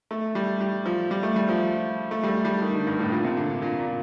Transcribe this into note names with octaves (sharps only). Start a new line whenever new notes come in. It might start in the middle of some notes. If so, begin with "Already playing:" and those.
A3
G3
G3
F3
G3
A3
G3
F3
A3
G3
A3
G3
D#3
D3
G2
A2
A#2
C3
D3
A#2
A#2